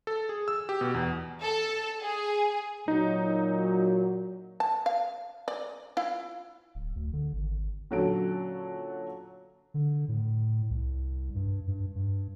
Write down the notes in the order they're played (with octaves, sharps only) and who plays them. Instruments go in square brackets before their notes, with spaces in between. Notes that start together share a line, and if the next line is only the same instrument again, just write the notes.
[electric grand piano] A4
G#4
E6
G4
B2
E2
[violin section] A4
G#4
[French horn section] A#2 F#3 [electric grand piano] D#4
[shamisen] A5
F5
D5
E4 F4 F5
[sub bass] D1
D2
D3
G#1
[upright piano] A#2 D3 F#3 C#4 A4 D7
[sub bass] D3
A2
C2
G2
G2
G2